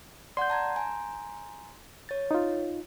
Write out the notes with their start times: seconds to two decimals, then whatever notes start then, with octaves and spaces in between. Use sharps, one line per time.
0.37 D5 F#5 C6 G6
0.50 A5 A#5 G#6
0.76 G#5 A#5
2.09 C#5 A6
2.31 D#4 F4